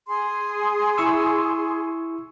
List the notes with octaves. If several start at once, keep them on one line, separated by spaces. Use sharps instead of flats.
G#4 C6
E4 C#6 E6